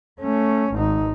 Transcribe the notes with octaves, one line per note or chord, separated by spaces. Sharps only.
A3 C#4
G#1 D#4